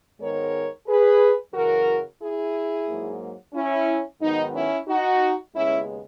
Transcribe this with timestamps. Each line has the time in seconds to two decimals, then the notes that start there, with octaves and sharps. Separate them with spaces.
0.20 G#2 D#3 G#3 B3 A#4 C#5
0.86 G#4 B4
1.53 F#2 C#3 E3 F#4 A#4
2.20 E4 G#4
2.87 G#2 F#3 A#3
3.53 C#4 E4
4.20 G#2 D#3 F#3 B3 D#4
4.53 C#4 E4
4.86 D#4 F#4
5.54 D#2 C#3 G#3 B3 C#4 E4